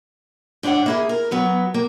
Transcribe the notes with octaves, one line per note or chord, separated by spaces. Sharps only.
G#2 D4 B4 C#5 F#5
A#3 E4 G#4
A#4
F#3 B3 B4
A#3